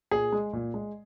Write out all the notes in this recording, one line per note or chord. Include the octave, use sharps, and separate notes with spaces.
A#2 G#4
G#3
A#2
G#3